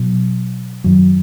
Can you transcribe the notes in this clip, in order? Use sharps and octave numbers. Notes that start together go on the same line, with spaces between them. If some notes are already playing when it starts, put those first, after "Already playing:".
Already playing: B2 F#3
F#2 D#3 F#3